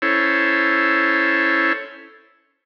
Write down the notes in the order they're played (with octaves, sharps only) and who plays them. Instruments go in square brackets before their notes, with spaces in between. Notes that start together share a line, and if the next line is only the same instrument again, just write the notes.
[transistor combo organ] C#4 E4 A4 C5 C#5